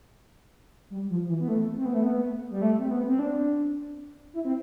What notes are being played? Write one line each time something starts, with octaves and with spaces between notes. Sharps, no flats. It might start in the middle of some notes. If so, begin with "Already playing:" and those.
G3
F3
E3
B3
A3
C4
B3
A3
B3
G3
A3
C4
B3
C4
D4
E4
C4